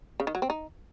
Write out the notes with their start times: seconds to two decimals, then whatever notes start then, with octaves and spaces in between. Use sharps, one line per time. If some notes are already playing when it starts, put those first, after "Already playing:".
0.20 C#3
0.27 D#3
0.35 F#3
0.42 C4
0.50 D#4